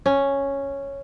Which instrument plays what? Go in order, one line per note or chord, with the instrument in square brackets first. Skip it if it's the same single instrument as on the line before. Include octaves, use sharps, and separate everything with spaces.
[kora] C#4